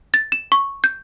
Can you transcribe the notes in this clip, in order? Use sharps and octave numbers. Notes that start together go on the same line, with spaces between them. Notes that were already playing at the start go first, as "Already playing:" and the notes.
A6
E7
C#6
G6